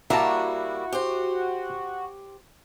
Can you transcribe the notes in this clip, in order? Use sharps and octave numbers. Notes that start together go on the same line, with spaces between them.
G3 A#3 E4 F#4 E5 A5 A#5
G4 C5